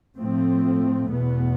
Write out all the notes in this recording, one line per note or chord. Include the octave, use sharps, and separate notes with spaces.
A2 F3 A3 C4
E2 B2 B3